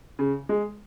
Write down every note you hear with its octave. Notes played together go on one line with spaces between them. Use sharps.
C#3
G#3